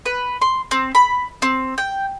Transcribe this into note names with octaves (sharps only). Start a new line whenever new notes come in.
B4
C6
C4
B5
C4
G5